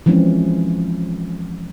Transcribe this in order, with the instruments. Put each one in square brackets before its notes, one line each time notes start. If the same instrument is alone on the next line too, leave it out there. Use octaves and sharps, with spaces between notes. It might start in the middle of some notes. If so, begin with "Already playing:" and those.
[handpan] E3 F3 G#3 C4 C#4